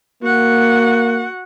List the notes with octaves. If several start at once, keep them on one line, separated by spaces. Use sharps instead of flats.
A#3 F#4 F#5